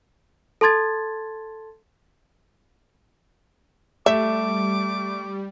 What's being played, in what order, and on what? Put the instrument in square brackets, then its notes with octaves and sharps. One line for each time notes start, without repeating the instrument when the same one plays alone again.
[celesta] A4 A5 C6 G#6 A6
[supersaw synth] G3 [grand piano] A3 E7 [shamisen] E5 [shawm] D6